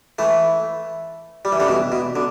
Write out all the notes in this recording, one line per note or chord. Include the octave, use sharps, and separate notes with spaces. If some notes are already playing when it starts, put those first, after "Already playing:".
E3 A3
G3
E3
D3 G3
B2 E3
B2
D3